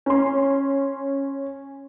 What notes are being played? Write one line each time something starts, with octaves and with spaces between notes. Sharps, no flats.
C#4 C6